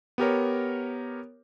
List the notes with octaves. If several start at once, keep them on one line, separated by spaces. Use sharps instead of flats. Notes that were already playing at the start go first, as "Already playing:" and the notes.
B3 G4 A#4 C#5